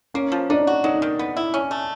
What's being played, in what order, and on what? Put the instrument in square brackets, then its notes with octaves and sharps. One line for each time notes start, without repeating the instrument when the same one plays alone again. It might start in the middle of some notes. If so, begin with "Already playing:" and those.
[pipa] A#3 [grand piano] C#4
[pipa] F3
[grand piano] D4 [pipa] D#4
[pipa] F#4
[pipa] F#3 [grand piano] D#4
[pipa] D#3
B3
E4
C#4
A3